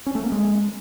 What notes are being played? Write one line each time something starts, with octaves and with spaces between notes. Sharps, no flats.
C#4
A3
A#3
G#3